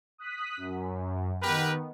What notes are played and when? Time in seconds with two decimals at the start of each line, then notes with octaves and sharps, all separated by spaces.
0.18 D#6 F#6 B6
0.57 F#2
1.43 D#3 B3 G4 A#4 B4